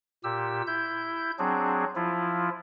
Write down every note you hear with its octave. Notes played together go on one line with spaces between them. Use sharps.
A#2 G4 E6
E4 G6
F#3 C4 D4 G#4
F3 E4 F4